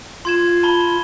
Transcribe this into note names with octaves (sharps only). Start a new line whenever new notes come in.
F4 C6 G#6 E7
A5 B5 G7